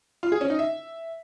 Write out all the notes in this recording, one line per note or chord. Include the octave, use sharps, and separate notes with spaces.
F4
G#4
C#4
D#4
E5